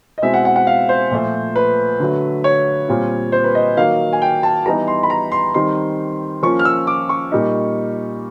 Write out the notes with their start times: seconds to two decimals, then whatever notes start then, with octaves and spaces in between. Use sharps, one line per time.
0.18 D#5
0.22 B2 G#3 C4 E4 E5
0.34 F#5
0.45 F#5
0.56 F#5
0.67 F5
0.89 C5
1.11 A#2 F3 A3
1.56 B4
2.00 D3 F#3 A3
2.44 C#5
2.89 A#2 G3 C4 F4
3.32 C5
3.44 B4
3.55 D#5
3.77 D#3 F#3 A#3 D#4 F5
4.13 G#5
4.22 G5
4.43 A5
4.66 E3 G3 B3 D#4 A#5
4.88 C6
5.03 B5
5.10 A#5
5.32 C6
5.54 D#3 G3 C4 D#4 C6
6.43 F3 A#3 C#4 F4 C#6
6.59 F6
6.65 E6
6.87 D6
7.09 C#6
7.32 A#2 G3 A#3 D#4